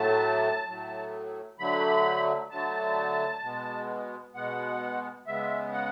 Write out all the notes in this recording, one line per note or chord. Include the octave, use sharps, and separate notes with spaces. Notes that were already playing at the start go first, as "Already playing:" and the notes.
Already playing: A2 F#3 A3 A5
A2 F#3 A3
D3 F#3 A3 B5
D3 F#3 A3 A5
B2 G#3 B3
B2 G#3 B3 F#5
C#3 G#3 B3 E5
F#5